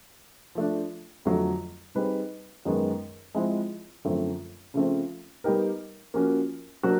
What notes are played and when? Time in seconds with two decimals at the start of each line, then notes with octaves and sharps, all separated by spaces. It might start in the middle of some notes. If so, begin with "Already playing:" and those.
0.55 F3 A3 D4
1.25 F2 D3 F#3 A3
1.95 G3 C4 D#4 G#4 B4
2.65 F#2 D#3 G#3 B3
3.34 F3 G#3 C4 E4 G#4
4.05 F#2 D3 F3 A3 C4
4.74 C#3 F3 A3 C4
5.44 G3 B3 D#4 G4 A#4
6.14 F3 A#3 C#4 F#4
6.83 F#3 A#3 D4 F#4